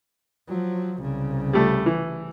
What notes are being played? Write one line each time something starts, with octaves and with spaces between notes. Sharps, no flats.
F3 F#3
C2 C#3
G3 A3
E3